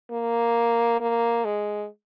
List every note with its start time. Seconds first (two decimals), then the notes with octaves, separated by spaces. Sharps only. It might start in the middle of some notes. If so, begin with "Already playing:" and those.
0.11 A#3
1.01 A#3
1.45 G#3